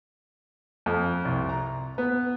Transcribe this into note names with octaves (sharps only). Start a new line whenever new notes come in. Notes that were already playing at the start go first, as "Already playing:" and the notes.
F2
C2
A#5
B3